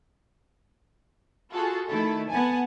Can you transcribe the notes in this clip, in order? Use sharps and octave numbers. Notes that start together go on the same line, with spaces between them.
F4 F#4 G#4 A4
D#3 A3 E4 A4
B3 F#5 G#5 A5